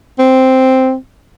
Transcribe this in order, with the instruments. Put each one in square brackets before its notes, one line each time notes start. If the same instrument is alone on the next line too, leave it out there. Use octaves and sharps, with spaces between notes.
[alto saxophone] C4